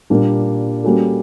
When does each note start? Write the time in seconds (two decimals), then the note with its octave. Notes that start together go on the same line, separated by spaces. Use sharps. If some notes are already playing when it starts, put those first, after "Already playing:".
0.10 A#2 G3 A#3 D4
0.84 G3 A#3 C#4 F#4 A4